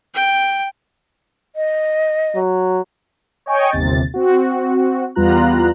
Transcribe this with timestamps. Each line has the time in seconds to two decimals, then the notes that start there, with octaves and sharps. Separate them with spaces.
0.14 G5
1.56 D#5
2.36 F#3
3.46 C#5 D#5 G5 G#5 C#6
3.72 G1 D#2 C3 A6
4.14 C4 F#4
5.15 E2 G3 B3 F4 A#5 F#6